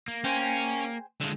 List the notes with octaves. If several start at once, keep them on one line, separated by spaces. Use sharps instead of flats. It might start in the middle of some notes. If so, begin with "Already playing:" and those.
A#3
C#4 G#4 C5 G5
D3 G#3 A3 F5